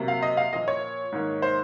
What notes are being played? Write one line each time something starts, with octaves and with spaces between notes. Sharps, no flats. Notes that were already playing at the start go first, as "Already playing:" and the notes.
Already playing: C3 F#3 A#3
F5
D#5
F5
A#2 F3 A#3 D#5
C#5
G#2 D#3 A#3
C5